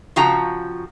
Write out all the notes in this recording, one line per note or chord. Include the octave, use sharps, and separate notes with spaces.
C#3 F3 F#4 G5 A#5